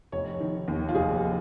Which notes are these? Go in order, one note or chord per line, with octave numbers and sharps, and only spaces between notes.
F1 C#5
D#3
D#2
F4
F1 G#4